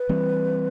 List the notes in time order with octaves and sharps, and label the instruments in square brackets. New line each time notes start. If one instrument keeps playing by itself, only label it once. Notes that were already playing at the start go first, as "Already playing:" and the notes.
Already playing: [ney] B4
[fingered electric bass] E3 G3 C4